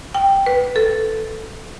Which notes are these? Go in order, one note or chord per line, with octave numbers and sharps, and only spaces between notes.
G5
B4
A4